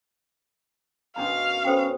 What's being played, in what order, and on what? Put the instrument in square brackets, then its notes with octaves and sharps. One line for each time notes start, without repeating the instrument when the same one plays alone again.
[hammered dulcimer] F#2 B2 G#3 [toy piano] C#4 D4 A#5 [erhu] F5
[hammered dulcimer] B3 [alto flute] C#4 [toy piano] A4 C5 G5